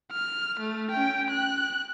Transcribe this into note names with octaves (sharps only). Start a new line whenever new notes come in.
F6
A3
C#4 G5
F#6